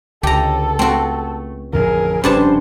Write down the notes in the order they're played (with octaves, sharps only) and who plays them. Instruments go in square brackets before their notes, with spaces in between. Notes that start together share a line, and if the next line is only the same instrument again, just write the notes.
[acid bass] C#2 [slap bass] D3 [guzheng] G4 A#5 [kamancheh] A4
[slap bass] A3 [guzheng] C4 F#4
[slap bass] A1 F2 D3 [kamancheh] G#4 A#4
[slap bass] F1 C#3 C#4 [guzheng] G2 D4 A5 [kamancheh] B4 C5